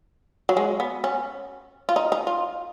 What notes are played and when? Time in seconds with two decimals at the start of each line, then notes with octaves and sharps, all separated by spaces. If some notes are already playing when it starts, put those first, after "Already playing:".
0.49 F#3
0.57 G#3
0.80 B3
1.04 C#4
1.89 F4
1.96 D#4
2.12 D#4
2.27 F4